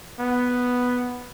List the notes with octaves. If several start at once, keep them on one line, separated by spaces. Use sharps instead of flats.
B3